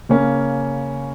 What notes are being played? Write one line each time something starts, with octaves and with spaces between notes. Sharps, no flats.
C#3 A#3 C#4